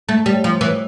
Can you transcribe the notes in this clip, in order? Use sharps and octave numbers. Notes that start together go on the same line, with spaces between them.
A3
G3
F3
E3